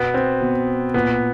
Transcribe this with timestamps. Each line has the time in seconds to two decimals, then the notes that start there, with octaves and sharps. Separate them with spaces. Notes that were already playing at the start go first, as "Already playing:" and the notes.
Already playing: B2 B3
0.14 C4
0.41 B2
0.94 A#2 B3